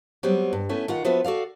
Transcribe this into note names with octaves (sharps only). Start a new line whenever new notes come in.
F#3 G3 B3 C4
G2
A3 B3 C#4 E4
D#3 F4 F#5
F3 B3 F4 F#4 B4 E5
F#4 A4 D5 F5